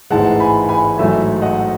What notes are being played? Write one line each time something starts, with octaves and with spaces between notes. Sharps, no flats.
A1 G#2 E3 G#3 F#5 A5
G#5 B5
G#5 B5
A1 G#2 F#3 A3 E5 G#5
D#5 F#5